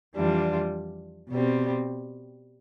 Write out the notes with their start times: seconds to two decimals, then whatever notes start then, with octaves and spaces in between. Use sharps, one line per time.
0.15 F2 E3 G3 D4 F4
1.31 B2 G3 C4